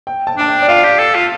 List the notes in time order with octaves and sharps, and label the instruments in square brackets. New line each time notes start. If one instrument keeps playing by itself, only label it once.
[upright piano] G5
A5
[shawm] D4 [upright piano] A5
[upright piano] G5
D5
[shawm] F4 [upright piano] F5
[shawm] G4
A4
F4